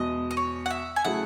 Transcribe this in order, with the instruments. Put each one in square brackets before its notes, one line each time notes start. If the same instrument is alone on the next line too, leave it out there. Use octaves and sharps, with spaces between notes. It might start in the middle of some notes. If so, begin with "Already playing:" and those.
Already playing: [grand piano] E2 B2 G#3 [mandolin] D#5
[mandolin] D#5
C#5
F#5
E5
G#5
[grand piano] C#3 F#3 A3 E4 G#4 [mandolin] F#5